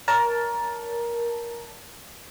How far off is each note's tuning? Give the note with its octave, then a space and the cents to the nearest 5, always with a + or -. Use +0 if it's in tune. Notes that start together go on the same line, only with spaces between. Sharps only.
A#4 +15 C#5 +35 A5 +0